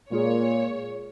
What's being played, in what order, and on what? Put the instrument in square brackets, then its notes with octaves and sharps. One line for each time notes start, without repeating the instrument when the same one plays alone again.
[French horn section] A#2 [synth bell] G#3 F4 G#4 [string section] C#5